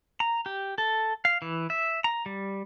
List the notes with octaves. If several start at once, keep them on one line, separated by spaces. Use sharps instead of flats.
A#5
G4
A4
F5
E3
E5
A#5
G3